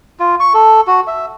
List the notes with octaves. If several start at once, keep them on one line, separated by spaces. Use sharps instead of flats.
F4
C#6
A4
F#4
E5